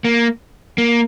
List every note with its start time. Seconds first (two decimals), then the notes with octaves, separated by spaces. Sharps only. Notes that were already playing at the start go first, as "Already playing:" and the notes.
0.05 A#3
0.78 A#3